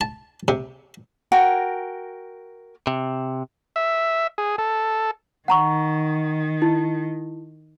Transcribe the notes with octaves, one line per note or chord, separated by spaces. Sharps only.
A5
C3
F#4 A#4 G5 G#5
C3
E5
G#4
A4
D#3 F#5 A#5 C#6
E4